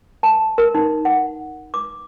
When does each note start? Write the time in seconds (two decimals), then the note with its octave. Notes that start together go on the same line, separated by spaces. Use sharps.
0.23 A5
0.58 A#4
0.75 D#4
1.05 F#5
1.74 D6